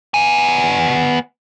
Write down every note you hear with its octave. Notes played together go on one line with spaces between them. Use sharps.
B3 G#5